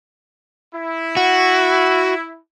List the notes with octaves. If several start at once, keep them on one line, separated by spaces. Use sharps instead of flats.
E4
F#4